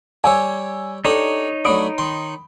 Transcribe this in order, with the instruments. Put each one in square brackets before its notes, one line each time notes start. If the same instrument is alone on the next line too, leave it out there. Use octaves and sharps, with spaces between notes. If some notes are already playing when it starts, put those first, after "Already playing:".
[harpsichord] G3 G4 C#5 [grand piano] G#5 E6
[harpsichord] D4 G4 D#6 [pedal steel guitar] D#4 C#5 [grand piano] A4
[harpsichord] F#3 A3 D4 [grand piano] B5 D#6 D7
[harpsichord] D#3 C6